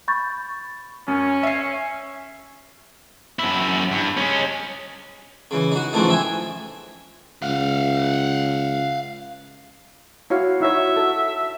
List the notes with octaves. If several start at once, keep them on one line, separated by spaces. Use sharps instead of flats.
B5 C#6 G6 A6
F#2 C#4
E5 C7
F#2 E4
G2
G#3 C#4
C#3 E3
D#4 F#4
G#2 C#3 E3 F3 A3 D#4
E5 G5 G#5
C#2 F5 F#5
E4 F#4 C#5 F5
D#4 E4 C#5 E5
A4